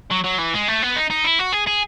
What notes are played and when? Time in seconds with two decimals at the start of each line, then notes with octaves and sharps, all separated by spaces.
0.11 F#3
0.24 F#3
0.39 E3
0.54 G#3
0.68 A3
0.82 B3
0.96 D#4
1.10 D#4
1.24 E4
1.39 F#4
1.53 G#4
1.67 G#4